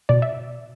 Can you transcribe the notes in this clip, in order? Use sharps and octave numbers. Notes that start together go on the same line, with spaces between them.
B2 D5
E5